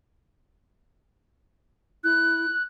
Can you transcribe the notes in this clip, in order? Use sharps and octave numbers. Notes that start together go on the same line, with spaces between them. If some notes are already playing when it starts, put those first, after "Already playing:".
E4 F#6